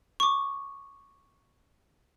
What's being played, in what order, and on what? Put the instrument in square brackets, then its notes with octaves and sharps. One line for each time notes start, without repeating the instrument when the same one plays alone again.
[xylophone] C#6 D6